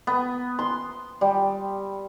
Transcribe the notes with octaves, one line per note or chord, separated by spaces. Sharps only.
B3
C6
G3